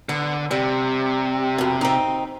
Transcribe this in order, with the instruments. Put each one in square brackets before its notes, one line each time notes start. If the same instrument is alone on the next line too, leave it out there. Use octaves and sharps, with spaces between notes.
[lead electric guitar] D3 [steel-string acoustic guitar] B3
[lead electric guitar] C3 [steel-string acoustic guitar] G3
[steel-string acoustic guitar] F2 B2
C4 D#4